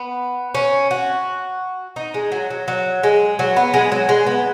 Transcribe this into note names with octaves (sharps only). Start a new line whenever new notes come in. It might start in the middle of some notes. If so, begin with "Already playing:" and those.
Already playing: B3
C#4
F#4
D#4
G#3
F#3
F#3
F#3
G#3
F#3
B3
G#3
F#3
G#3
B3